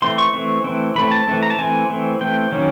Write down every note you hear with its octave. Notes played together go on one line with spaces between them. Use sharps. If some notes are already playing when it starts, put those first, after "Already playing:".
E3 A3 C4 C6
C#6
E3 A3 C4
E3 A3 C4
E3 A3 C4 B5
A5
E3 A3 C4
A#5
A5
E3 A3 C4 G#5
E3 A3 C4
E3 A3 C4 G5
D#3 F#3 A#3 C#4